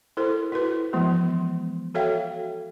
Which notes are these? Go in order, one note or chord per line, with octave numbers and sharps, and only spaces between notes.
E4 A4 A#4 C5
E4 F#4 B4
E3 F3 G#3 B3
F#4 A4 C#5 E5 F5 G5